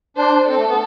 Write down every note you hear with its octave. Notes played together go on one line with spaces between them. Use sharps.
D4 C5
C4 A4
A3
B3